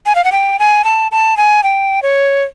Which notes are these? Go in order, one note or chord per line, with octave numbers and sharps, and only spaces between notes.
G#5
F5
F#5
G5
G#5
A5
A5
G#5
G5
C#5